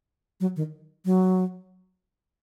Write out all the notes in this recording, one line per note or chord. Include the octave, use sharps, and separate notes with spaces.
F#3
D#3
F#3